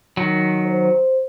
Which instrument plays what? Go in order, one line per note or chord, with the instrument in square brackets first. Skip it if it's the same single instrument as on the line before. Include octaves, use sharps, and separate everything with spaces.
[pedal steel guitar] D#3 F#3
[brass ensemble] C5